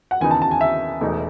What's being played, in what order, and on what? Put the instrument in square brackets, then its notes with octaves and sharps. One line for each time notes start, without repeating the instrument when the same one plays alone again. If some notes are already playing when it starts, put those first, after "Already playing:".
[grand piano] F#5
D#2 C#3 E3 B3 D#4 G#5
A5
A5
G#5
E5
E1 E2 B2 A3 D#4